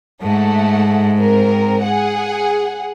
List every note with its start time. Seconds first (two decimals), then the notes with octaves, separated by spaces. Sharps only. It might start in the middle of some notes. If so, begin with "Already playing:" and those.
0.22 G#2 A3 F#5
1.19 C4 A#4
1.84 G#4 F#5